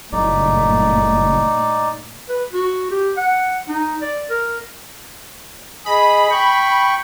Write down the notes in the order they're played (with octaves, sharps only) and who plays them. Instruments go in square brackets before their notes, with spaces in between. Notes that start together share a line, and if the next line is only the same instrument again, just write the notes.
[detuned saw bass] F#1 [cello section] G2 A#2 A3 [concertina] D#4 D5
[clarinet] B4
F#4
G4
F#5
D#4
D5
A#4
[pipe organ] G#4 D#5 [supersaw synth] B5
[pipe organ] G5 C#6